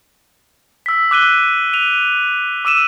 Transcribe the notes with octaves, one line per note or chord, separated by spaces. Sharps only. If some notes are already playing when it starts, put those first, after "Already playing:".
E6 B6
D6 F#6 D#7 G7
D#7 F7
D6 E6 D#7 E7